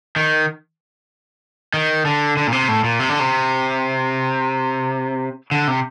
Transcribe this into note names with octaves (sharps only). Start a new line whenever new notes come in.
D#3
D#3
D3
D3
A#2
C3
A2
A#2
C3
D3
C3
D3
C3